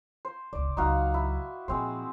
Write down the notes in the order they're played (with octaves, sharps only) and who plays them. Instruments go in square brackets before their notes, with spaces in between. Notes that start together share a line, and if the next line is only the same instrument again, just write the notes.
[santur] C5
[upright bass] E1 C#2 [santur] D5
[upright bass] C#2 F#3 [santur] D#4 F#4 F5
[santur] E4
[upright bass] A#2 F3 [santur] G#3 C4 C5